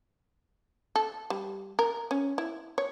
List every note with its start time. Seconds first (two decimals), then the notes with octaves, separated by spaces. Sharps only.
0.96 A4
1.30 G3
1.79 A#4
2.11 C#4
2.38 E4
2.78 C#5